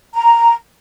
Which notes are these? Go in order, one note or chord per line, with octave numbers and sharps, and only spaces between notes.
A#5